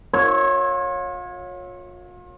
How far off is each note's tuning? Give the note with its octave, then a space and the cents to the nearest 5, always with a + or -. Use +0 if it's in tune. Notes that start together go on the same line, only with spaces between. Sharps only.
F4 +40 C#5 -10 E5 -15